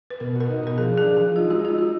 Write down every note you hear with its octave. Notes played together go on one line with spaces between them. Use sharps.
B4
B2 A#4
F#4 A#4
D#4
B2 A#4
F3 G#4
D4
G#4
F3
F3 G#4
D#4 F4
G#3 F#4
D#4 F4
F#4